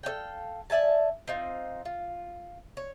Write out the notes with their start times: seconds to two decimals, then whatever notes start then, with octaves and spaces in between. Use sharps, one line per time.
0.03 A4 C#5 F5 G5
0.70 D5 E5 G#5 A5
1.28 C4 D#4 F4
1.85 F4
2.77 C#5